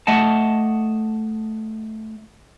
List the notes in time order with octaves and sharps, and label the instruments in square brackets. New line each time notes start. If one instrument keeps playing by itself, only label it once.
[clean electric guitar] A3 D#5 F#5 A5